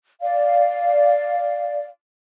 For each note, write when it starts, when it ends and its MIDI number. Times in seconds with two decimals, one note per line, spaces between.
0.22 1.86 74
0.22 1.86 77